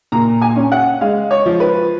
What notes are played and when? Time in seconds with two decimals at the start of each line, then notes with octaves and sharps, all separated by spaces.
0.12 A#2 A#5
0.42 G#5
0.56 C#4
0.72 F#5
1.01 G#3 F5
1.31 C#5
1.46 F3
1.60 B4